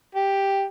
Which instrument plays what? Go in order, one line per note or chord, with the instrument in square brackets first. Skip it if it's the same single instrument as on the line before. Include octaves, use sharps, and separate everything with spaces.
[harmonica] G4